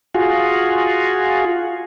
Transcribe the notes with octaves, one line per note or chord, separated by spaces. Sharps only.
F4 F#4 G#4